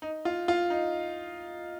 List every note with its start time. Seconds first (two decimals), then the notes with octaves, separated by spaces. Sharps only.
0.02 D#4
0.25 F4
0.48 F4
0.70 D#4